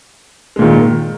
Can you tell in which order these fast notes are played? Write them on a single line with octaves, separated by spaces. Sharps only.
G#3 A#2 D#3